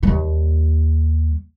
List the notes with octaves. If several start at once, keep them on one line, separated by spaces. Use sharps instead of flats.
D#2 G3